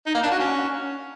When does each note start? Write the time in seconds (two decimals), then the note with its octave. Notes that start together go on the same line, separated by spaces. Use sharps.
0.06 D#4
0.15 A#3
0.23 D4
0.31 F#4
0.40 C#4